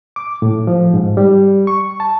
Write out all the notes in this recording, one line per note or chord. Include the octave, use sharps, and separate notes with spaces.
D6
A2
F3
G#2
G3
C#6
A5